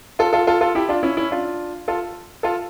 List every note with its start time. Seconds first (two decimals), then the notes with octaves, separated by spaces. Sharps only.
0.19 F4 A4
0.33 F4 A4
0.47 F4 A4
0.61 F4 A4
0.75 E4 G4
0.89 D4 F4
1.03 C#4 E4
1.17 C#4 E4
1.31 D4 F4
1.88 F4 A4
2.43 F4 A4